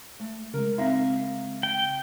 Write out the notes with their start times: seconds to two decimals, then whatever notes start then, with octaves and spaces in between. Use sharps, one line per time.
0.20 A3
0.54 C#3 G#3 A#4
0.78 C4 D#4 E5 F5
1.63 G5